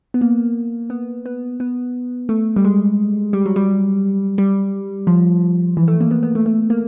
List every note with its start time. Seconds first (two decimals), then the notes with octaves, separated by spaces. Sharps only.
0.14 B3
0.21 A#3
0.90 B3
1.26 B3
1.60 B3
2.29 A3
2.56 G3
2.65 G#3
3.33 G3
3.46 F#3
3.56 G3
4.38 G3
5.07 F3
5.77 E3
5.88 A3
6.00 A#3
6.11 B3
6.23 B3
6.35 A3
6.46 A3
6.70 A#3